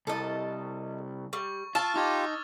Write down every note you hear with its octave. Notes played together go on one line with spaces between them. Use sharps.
C2 A4 D#5
G3 C#6
F4 A5 E6 F6 A6
D#4 F4 G4 D6 F6 G#6